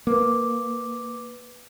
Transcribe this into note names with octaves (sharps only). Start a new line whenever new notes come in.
A#3 B4 D6